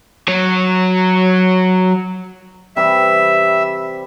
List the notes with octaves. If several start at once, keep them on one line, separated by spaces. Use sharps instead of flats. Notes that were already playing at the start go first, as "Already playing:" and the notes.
F#3 C#5
C3 E3 G3 E5